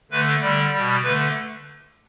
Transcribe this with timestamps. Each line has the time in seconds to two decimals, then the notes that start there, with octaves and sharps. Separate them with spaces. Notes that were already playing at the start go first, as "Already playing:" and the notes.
0.11 D3 A3 B4
0.41 D3 G3 D5
0.72 B2 G3
1.03 D3 A3 B4